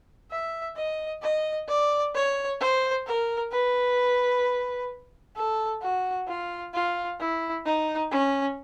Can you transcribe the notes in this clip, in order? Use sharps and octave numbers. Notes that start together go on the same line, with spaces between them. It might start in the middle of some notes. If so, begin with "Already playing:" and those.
E5
D#5
D#5
D5
C#5
C5
A#4
B4
A4
F#4
F4
F4
E4
D#4
C#4